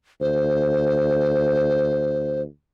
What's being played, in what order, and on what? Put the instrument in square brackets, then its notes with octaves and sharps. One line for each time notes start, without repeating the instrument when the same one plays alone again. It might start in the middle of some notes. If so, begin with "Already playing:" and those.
[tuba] D2 [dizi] C5